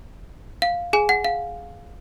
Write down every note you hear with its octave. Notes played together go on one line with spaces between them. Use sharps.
F5
G#4 G#5
F#5
F5